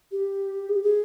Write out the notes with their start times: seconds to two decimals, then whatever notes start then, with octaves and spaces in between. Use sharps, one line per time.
0.11 G4
0.69 G#4
0.76 G4
0.83 G#4